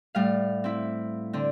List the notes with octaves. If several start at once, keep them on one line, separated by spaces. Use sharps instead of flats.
A2 G3 F5
C4 E4
D3 C4